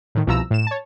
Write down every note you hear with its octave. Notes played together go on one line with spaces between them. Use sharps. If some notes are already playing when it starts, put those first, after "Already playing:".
A2 D#3
C2 B2 F3 A#5 E6
A2 E7
C#5 A5